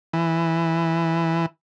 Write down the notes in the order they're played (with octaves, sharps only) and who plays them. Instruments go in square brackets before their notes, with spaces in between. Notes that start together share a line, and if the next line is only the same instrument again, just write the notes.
[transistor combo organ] E3